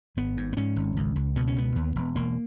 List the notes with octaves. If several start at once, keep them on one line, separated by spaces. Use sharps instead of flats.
G#1 B3
G#2
B3
G#2 C#4
G#1
C#2
C#2
B2 B3
C#4
C#2 B3
D#2
E1
E1 A#3